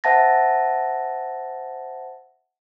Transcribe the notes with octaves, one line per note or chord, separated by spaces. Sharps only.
C5 E5 F#5 A5 A6 A#6